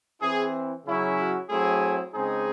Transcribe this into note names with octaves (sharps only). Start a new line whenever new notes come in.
E3 C4 E4 G#4
C#3 F#3 C#4 E4
F#4
F#3 A3 C4 E4 G#4
C#3 G#3 C4 D#4 G#4